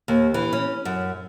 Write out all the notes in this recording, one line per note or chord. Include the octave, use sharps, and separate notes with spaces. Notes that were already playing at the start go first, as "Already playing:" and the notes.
D#2
E3
C#4
F#2